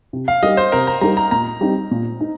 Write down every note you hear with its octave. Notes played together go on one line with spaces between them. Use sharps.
C3
F5
G3 D#4 G4 A#4 D#5
C5
C3 A#4
A#5
G3 D#4 G4 A#4 A#5
A#5
A#2 A#5
G3 C4 D#4
A#2
D#4